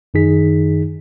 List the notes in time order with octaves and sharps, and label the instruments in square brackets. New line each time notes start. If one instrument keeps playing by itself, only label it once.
[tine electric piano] F#2 D#3 D#4 G#4 B6